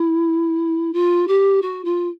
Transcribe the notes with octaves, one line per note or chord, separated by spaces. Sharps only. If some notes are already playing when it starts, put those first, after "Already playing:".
Already playing: E4
F4
G4
F#4
F4